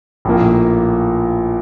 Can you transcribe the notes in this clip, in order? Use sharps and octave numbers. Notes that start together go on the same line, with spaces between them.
A#1 A2 F3 A#3